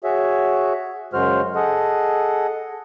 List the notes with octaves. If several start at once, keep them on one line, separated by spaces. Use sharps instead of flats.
F#4 G#4 C#5 E5
F#2 C#3 G#3 F#4 C5 F6
G#4 A4 D#5 F#5